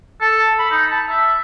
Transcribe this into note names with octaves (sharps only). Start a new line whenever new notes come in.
A4
B5
D#4
A5
E5